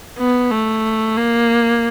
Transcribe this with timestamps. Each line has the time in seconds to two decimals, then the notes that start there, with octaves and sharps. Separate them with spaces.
0.18 B3
0.51 A3
1.17 A#3